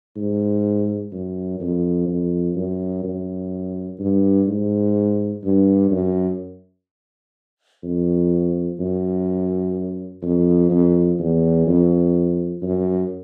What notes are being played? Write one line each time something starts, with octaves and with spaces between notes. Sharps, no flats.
G#2
F#2
F2
F2
F#2
F#2
G2
G#2
G2
F#2
F2
F#2
F2
F2
E2
F2
F#2